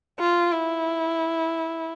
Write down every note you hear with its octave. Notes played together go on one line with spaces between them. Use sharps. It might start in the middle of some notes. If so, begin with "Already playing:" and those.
F4
E4